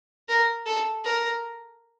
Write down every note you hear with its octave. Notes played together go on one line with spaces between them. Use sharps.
A#4
A4
A#4